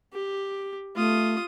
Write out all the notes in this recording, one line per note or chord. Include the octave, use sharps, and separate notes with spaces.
G4
A3 F4 D#6